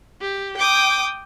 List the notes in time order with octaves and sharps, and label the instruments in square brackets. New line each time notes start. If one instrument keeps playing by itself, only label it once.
[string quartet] G4
G5 D6 D#6